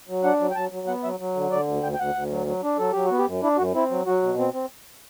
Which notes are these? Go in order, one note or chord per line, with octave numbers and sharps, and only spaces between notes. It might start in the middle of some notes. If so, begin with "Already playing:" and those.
F#3
D4 F#5
F#3
G5
F#3 A5
F#3
B3 F#5
F#3 E5
F#3
D3
D3 D5
D2
D2 G5
G5
D2 F#5
D2
F#3
F#3
D4
F#3 A4
F#3 G4
F#4
B3
G4
F#2
D4 E4
F#2 F#4
C4 E4
F#3
F#3 F#4
B2
C4
C4